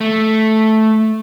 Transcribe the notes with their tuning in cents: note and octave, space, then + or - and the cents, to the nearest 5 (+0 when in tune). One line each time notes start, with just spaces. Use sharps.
A3 -5